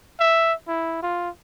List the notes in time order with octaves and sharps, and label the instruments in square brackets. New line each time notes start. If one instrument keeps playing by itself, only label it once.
[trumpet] E5
E4
F4